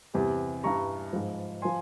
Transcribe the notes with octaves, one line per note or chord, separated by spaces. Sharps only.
E2 C3 G3
G2 E3 G3 A#5 C#6
G#2 F3
F3 G#5 C6